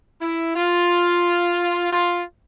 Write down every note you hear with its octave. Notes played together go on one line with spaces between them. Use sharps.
E4
F4
F4